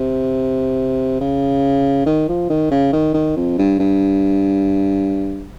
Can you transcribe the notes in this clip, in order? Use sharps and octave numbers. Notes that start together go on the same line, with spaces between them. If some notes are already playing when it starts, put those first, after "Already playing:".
Already playing: C3
C#3
D#3
F3
D#3
C#3
D#3
D#3
F2
G2
G2